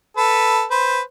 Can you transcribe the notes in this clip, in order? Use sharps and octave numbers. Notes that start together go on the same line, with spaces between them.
A4 B4
B4 C5